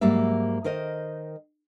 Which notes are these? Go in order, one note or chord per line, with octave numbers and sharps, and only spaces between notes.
G#2 F#3 G3 A#3 E5
D#3 A#4 C5 D#5